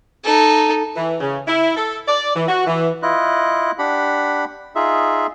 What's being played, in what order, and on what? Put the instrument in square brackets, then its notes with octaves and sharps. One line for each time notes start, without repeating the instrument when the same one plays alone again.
[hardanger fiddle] D#4 A4
[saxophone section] E3
C#3
E4
A4
D5
E3
F#4
E3
[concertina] E4 F4 D#5 F#6
D4 G4 F#5 B5
D#4 F4 G#4 E5